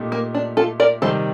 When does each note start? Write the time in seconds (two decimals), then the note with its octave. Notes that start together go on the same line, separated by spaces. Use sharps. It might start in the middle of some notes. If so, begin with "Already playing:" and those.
Already playing: A#2 A3 D#4 G4
0.12 A#3
0.34 D4
0.57 F4 A4
0.80 A#4 D5
1.02 C3 D#3 G3 A4 C5